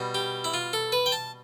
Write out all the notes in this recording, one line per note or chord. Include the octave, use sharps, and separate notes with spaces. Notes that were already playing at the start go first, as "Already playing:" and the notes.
Already playing: B2 G3
G4
E4
F4
A4
B4
G5
A5